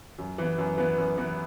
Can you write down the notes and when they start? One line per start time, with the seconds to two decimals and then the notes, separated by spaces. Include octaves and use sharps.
0.18 F#2
0.38 E3 B3
0.58 F#2
0.77 E3 B3
0.98 F#2
1.17 E3 B3